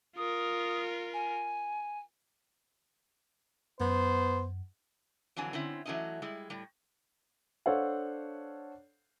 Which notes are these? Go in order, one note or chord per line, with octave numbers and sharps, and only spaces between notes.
F4 A#4 D#6
G#5
F#2 B3 C5
F2 D3 E3 F#3 G#5
D3 C4 C#4 E4
E3 F#3 A3 C#4 E4 D#5
G3 G#3 E4
A2 G3
D4 A4 C5 C#5 F5 F#5